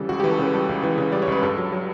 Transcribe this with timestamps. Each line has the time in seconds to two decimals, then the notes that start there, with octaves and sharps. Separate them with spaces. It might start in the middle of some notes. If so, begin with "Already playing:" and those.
Already playing: C#3 E3 G3 A4
0.09 C#2 F#4
0.20 E3 G4
0.31 A4
0.39 C#3 B4
0.54 G3 A4
0.69 C#2
0.84 E3
0.98 C#3
1.12 G3 D5
1.22 C#5
1.28 C#2 B4
1.43 G2 A4
1.58 F#3
1.72 F#3